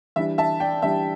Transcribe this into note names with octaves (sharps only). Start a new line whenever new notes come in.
E3 G3 D4 E5
E5 A5
D5 G5
E3 G3 D4 E5